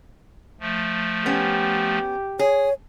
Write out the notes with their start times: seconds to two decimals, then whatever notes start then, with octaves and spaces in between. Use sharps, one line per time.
0.60 F3 A3
1.26 B3 C#4 G4
2.39 G#4 C#5